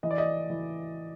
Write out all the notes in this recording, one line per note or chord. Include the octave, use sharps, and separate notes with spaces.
E3 D#5
D5
D#5
E3